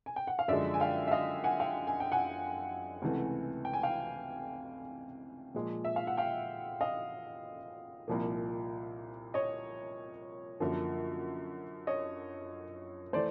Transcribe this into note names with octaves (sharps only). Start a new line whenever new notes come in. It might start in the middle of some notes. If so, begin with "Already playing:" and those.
G#5
G5
F#5
F5
F#2 D3 F3 G#3 D5 E5
G#5
F5 G5
E5
D#5 F5
F#5 G#5
F5 G5
G#5
G5
F#5 G#5
C#2 C3 E3 A3
G5
G#5
F5 G5
A#2 F3 G#3
E5
F5
F#5
F5 G5
D#5 F5
C2 A#2 F3 A#3
C#5 D#5
F#2 D3 F3 A#3
C#5 D#5
E3 A3 C5 D5